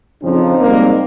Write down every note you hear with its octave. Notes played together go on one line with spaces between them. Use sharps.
F2 C#3 F3 C4 D#4
G#2 G3 A#3